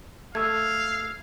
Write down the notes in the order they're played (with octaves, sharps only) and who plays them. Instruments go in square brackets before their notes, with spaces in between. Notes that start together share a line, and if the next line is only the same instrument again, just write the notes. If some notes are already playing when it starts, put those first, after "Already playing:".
[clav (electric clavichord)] A3 [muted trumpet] F5 [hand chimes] E6 G#6